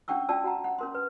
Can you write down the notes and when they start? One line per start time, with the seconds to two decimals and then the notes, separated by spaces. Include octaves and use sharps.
0.08 C#4 D4 F#5 G5 C#6 E6
0.29 C#4 F4 D5 G5 A5 E6
0.44 F#4 F#5 A#5
0.64 F#5
0.78 C#4 A#4 C6
0.94 B4